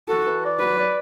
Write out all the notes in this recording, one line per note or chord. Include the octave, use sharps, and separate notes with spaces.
F#4 A4
E3
D5
F#3 B4
D5